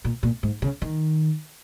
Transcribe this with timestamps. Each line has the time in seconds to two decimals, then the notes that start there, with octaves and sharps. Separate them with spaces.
0.05 A#2
0.23 A#2
0.43 G#2
0.62 C#3
0.82 D#3